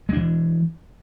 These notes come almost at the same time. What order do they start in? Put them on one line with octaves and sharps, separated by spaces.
G#3 D4 E3